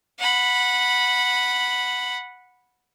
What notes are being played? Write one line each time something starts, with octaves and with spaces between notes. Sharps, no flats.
F#5 B5